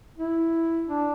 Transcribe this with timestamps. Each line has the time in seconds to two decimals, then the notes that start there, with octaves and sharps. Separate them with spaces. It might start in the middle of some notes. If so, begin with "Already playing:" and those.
0.18 E4
0.88 D4